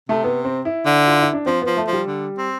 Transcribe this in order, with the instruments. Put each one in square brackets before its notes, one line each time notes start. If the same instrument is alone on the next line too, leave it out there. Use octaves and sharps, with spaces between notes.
[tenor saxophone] C3 [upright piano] A3
[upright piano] B3
C4
E4
[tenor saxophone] D3
[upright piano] F4
E4
D4
[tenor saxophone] F3 [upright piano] C4
[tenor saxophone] F3 [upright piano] B3
[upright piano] A3
[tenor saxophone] F3
[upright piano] G3
[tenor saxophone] D3
C4